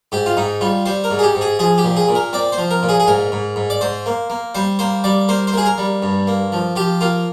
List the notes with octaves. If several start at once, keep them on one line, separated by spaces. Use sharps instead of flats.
G#2 G4
F4
G#2 D#4
G3 F4
G3 C5
A#4
G#2
G#4
G4
G#2
G#4
F3 G#4
G4
A#2
G#4
A#2
A#4
C4 D5
C5
F3
A#4
A#2
G#4
G#4
G#2 A#4
G#2
G#2
D5
G#2 C5
A#3
A#3
G3 C5
A#3 C5
G3 D5
A#3 C5
C5
A#3 G#4
A#4
G3
G2
A#3
F3
F3 G4
A#3 F4